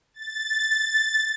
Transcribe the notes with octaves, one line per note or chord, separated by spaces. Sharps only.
A6